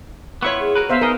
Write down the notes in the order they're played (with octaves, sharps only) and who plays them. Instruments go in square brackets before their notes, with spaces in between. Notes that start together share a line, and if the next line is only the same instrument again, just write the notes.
[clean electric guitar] B3 E4 F4 [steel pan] C#5 B5 C#6
[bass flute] G#4
[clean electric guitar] F#4 A#4 B4
[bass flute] B3 [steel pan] C5 E5 F5
[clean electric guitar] D#4 G#4 D#5 [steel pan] A#4